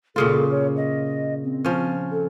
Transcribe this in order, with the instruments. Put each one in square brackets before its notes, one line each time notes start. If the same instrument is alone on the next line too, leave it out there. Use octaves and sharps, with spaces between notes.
[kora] A#2 C#3 F4 [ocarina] A4
[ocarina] C#5
D#5
C4
[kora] F3 C#4
[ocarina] A4